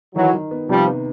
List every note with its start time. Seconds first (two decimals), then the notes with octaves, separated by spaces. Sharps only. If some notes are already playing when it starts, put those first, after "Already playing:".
0.15 D#3 E3 F#3
0.34 D#3
0.51 B3
0.69 C3 F3 G3
0.87 B3